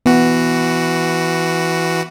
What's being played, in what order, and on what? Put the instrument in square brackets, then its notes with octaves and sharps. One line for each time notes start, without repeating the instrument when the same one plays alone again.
[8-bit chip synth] E3 F#4 [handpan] B3